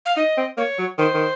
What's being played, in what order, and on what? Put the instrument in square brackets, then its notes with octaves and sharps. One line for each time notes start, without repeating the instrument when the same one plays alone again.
[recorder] F5
[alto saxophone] D#4 [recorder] D#5
[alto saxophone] C4
[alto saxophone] A#3 [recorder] C#5
[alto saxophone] F#3
[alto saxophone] D#3 [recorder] C5
[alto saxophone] D#3